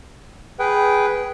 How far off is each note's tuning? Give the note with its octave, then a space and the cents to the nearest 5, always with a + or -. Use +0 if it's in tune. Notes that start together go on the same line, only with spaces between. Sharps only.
G#4 +0 B4 +0 G5 -20